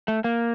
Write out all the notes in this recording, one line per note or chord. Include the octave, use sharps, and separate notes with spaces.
A3
A#3